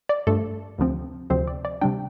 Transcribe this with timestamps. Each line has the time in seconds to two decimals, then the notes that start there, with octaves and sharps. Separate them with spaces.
0.09 D5
0.27 G2 F3 A3 A4
0.78 D2 C3 F3 C4
1.30 D2 C3 F3 C4 C5
1.47 D5
1.65 D5
1.81 C3 G3 D4 G5